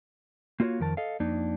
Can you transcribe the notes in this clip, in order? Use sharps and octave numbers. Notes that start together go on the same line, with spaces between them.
A#3 F4 F#4 C5 C#5
F2 D#3 A#4 A5
A4 D#5 F5
F2 A#3 D4 D#4